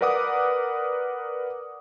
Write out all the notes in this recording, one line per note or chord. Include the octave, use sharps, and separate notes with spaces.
A#4 B4 D5 F#5 D6 D#6